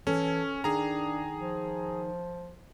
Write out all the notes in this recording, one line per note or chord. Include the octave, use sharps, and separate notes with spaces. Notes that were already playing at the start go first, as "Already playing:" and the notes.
E3 C#4 A4
D#3 D4 G#4 A#5
F3